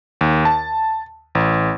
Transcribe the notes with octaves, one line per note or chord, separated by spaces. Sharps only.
D#2
A5
A1